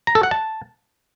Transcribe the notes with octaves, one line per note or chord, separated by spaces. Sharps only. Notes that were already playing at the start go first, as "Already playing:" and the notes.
A#5
A4
F#5
A5